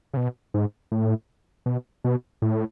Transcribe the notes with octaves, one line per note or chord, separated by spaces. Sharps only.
C#3
B2
G#2
A2
B2
B2
A2